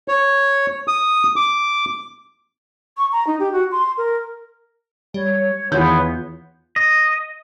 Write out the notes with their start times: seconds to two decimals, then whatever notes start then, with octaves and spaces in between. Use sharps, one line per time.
0.08 C#5
0.88 D#6
1.36 D6
2.97 C#6
3.12 A#5
3.27 D#4
3.40 G4
3.52 F#4
3.71 C6
3.98 A#4
5.14 G3 C#5
5.72 E2 D#3 B3 F4 G6
6.76 D#5